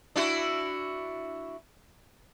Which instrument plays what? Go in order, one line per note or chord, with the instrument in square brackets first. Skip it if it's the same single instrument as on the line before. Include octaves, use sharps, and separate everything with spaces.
[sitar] D4 E4 F#4